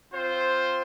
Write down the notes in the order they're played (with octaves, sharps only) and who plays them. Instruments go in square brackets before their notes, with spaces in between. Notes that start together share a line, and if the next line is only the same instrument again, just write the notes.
[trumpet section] C4 F4 C5